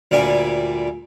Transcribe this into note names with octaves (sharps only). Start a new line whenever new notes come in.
D2 A#2 G3 G#5